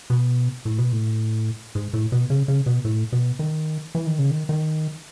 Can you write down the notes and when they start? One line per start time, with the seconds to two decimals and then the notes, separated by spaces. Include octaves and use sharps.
0.10 B2
0.65 A2
0.78 B2
0.92 A2
1.75 G#2
1.93 A2
2.12 B2
2.30 C#3
2.48 C#3
2.66 B2
2.85 A2
3.12 B2
3.39 D#3
3.95 E3
4.07 D#3
4.19 C#3
4.31 D#3
4.49 D#3